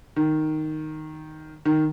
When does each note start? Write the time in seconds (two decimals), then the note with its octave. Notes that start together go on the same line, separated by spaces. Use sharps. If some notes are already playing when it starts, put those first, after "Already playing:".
0.16 D#3
1.65 D#3